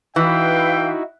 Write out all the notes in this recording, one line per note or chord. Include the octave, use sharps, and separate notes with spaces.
E3 D#4 E4 F#4 B4 F5 G5 E6